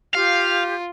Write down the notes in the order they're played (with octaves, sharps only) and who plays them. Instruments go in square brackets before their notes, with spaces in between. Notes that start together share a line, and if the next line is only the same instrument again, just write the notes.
[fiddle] F4 [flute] G4 [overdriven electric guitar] F5